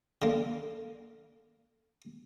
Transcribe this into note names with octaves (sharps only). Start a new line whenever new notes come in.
D3 A#3